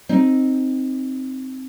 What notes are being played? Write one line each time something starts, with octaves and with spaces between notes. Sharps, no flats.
C4 D#4